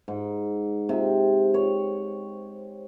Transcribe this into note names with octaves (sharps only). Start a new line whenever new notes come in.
G#2
C3
C#5